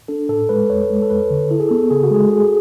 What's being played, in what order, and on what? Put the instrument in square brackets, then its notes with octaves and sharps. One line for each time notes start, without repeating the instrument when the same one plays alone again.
[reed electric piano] D4 [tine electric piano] A4
[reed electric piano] A2 [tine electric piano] A4
[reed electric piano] G#3 [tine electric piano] B4
[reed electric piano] E2 [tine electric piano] C#5
[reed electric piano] G#3
[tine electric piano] A4
[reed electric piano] E2 [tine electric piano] B4
[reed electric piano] D3
[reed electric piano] E4 [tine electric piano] A4
[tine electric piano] G#4
[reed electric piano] B3 [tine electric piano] A4
[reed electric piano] C#3 [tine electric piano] G#4
[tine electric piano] F#4
[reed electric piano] G#3 [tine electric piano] G#4
[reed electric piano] G#4